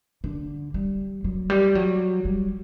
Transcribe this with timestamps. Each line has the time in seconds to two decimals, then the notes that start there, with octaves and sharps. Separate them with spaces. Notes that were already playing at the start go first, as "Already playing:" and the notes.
0.24 D3
0.74 G3
1.24 F#3
1.50 G3
1.75 F#3
2.25 G3